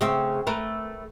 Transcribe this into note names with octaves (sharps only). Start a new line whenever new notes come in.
C#3 A3 C4
A3 A#4 B4